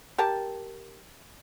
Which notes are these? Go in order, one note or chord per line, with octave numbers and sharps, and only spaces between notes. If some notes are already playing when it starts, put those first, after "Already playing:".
G4 A#4 A5